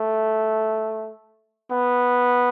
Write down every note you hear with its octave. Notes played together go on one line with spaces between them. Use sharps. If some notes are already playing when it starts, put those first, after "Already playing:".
Already playing: A3
B3